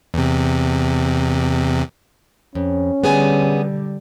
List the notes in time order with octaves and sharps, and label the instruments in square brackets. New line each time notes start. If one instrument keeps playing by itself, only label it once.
[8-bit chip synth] E2 C3
[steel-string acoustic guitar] F2 [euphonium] C#4
[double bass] D3 G3 [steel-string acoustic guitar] B3 G#4 G#5